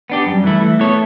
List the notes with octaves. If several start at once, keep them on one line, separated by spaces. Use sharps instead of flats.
B3 D4 G4
F#2 G3
E3 A3 E4
E3 A3
B3 E4 A4 C#5